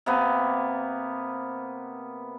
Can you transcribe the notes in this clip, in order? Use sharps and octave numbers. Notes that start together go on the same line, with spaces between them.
C3 A#3 B3